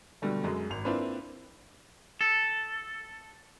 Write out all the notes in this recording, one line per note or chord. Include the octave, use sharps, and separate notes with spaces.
B2 D3 G3 A3
F#2 F#3 G#3
G#1 F7
A#3 C4 D4 E4 F4 B4
A4